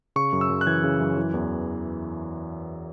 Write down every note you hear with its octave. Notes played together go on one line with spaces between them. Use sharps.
C#3 C#6
F#2
E6
F#2
F#6
E3 G#6
C#3
F#2
E3
E2